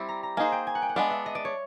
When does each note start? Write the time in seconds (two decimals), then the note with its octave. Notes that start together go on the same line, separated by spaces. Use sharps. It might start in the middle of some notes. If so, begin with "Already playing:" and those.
Already playing: G3 C4 E4
0.09 A#5
0.23 A#5
0.37 A#3 D#4 G#4 C5 G#5
0.52 G5
0.67 G#5
0.75 F#5
0.82 G5
0.89 F#5
0.96 G#3 B3 D4 F5
1.11 E5
1.26 D#5
1.35 D5
1.45 C#5